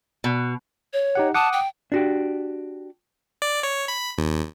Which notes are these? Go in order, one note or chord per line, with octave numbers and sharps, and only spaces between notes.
B2
C#5
D#4 G4 F#5
F#5 A5 D6 D#6
G5
D4 F#4 G4
D5
C#5
B5
D#2